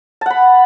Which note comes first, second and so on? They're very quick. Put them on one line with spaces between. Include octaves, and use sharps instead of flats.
A5 F#5 B5